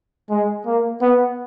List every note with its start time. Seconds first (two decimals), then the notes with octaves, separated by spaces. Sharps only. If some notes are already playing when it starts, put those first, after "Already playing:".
0.30 G#3
0.66 A#3
1.01 B3